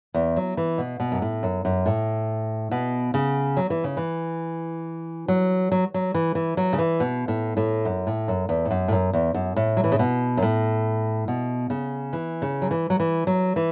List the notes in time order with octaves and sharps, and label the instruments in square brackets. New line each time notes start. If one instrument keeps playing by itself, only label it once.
[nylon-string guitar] E2
F#3
E3
B2
B2
F#2
A2
F#2
F#2
A2
B2
C#3
F#3
E3
C#3
E3
F#3
F#3
F#3
E3
E3
F#3
C#3
E3
B2
A2
A2
F#2
A2
F#2
E2
A2
F#2
A2
F#2
E2
F#2
A2
F#3
E3
C#3
B2
F#2
A2
B2
C#3
E3
C#3
F#3
E3
F#3
E3
F#3
E3